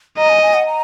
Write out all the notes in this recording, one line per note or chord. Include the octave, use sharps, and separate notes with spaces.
D#5 A#5
G#5
G#5
F#5
A#5